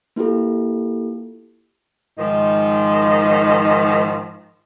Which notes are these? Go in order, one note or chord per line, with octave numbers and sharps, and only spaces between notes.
A#3 E4 F4 G4 A4
G#2 D#3 F3 D#4